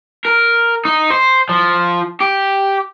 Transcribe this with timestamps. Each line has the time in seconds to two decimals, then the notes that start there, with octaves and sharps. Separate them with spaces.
0.25 A#4
0.85 D#4
1.10 C5
1.49 F3
2.21 G4